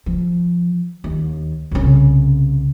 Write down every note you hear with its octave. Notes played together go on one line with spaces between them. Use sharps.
F3
D#2
C2 C#3